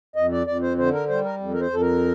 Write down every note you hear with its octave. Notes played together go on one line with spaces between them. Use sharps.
F2 D#5
D5
F2 D5
C5
D3 C5
A#4
G3 C5
A#4
F2
A#4
C5
F2 A4
A#4